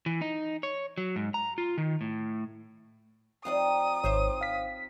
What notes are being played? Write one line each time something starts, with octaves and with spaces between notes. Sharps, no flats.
E3
D#4
C#5
F#3
G#2
A#5
F4
D#3
A2
F3 C4 D#4 D5 D#5 F5 D#6
G#1 D#3 C5 C#5 E5
F5 B6